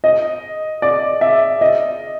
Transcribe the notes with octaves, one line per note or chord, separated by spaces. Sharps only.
D#5
D5
E5
D#5